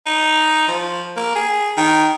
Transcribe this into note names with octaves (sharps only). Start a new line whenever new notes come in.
D#4
F3
A#3
G#4
D#3